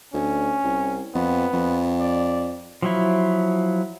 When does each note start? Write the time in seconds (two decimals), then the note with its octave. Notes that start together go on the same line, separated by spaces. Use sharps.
0.14 D2 C#4
0.64 C2
1.15 F2 B3
1.53 F2
2.00 D5
2.82 F3 F#3 E4